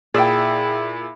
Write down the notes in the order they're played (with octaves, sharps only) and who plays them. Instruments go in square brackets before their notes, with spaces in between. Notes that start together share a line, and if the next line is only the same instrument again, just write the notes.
[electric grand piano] A#2 E6 [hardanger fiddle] E4 [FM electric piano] G#4 E5 [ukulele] D5 G5